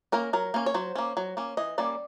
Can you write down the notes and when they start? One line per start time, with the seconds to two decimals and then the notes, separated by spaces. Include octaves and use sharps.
0.12 A#3 C#4 A#4
0.33 F#3 A#4
0.54 A#3 C#4
0.66 C#5
0.74 F#3 C5
0.96 A#3 C#4
1.17 F#3
1.37 A#3 C#4
1.57 E3 D#5
1.78 G3 A#3 C#4 D5